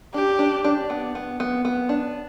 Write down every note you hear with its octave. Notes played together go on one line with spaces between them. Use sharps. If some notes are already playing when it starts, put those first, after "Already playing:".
D4 G4
D4
D4
B3
B3
B3
B3
D4